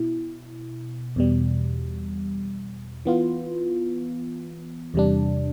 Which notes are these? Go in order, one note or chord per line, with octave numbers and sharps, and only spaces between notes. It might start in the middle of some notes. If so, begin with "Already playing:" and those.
Already playing: B2 E4
E2 B2 G3
E3 B3 F4
E2 C3 G3 D4